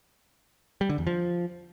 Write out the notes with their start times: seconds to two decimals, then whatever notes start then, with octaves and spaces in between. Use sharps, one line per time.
0.81 G3
0.89 D3
0.98 E2
1.07 F3